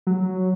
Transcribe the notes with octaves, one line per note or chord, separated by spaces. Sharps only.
F#3